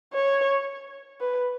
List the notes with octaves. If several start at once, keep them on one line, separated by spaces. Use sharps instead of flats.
C#5
B4